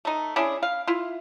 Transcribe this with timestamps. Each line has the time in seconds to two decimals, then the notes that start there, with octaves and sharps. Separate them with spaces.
0.05 A3 D#4
0.36 C#4 D4 E4 G#4
0.63 F5
0.87 E4 F4